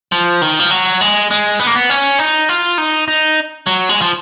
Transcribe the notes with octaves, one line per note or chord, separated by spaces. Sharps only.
F3
D#3
F3
F#3
G#3
G#3
B3
A#3
B3
C#4
D#4
F4
D#4
D#4
F#3
G#3
F3